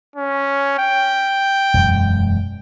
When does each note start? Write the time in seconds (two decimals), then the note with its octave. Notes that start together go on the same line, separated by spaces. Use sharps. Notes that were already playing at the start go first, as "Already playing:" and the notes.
0.16 C#4
0.79 G5
1.74 E1 F#2 G#3